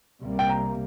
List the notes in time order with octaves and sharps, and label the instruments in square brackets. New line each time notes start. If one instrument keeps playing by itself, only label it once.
[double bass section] C2 C3 G3 A#3
[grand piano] G5
A#5